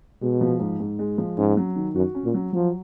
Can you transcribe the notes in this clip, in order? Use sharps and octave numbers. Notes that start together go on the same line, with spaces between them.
B2 G#3
F3
G#2
G#2
G#3
F3
G#2 C#4
F#3
D#3
F#2 F#4
C#4
A#2
F#3
F3 F#3